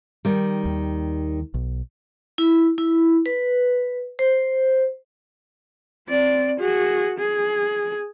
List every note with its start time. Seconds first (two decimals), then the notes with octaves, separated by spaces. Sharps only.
0.25 D#3 G3
0.65 D#2
1.54 B1
2.38 E4
2.78 E4
3.26 B4
4.19 C5
6.08 C4 D5
6.60 F#4 G#4
7.18 G#4